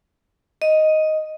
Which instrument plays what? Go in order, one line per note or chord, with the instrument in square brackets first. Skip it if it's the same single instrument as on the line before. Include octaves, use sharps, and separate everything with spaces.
[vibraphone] D#5